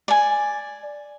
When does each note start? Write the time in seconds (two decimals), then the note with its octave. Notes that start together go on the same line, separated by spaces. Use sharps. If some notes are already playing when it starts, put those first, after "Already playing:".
0.08 D5 G#5